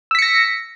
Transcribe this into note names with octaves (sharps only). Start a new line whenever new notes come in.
E6 A#6 B6 C#7